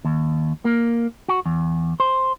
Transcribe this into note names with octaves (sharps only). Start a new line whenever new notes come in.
D#2
A#3
F#4
E2
C5